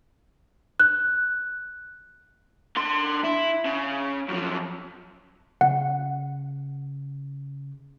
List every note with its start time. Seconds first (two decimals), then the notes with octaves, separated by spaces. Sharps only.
0.80 F#6
2.76 D3 C6
3.24 E4
3.65 C#3
4.28 F#2 F3
5.61 C#3 F#5